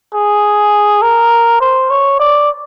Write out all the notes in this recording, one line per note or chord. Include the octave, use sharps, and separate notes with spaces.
G#4
A#4
C5
C#5
D5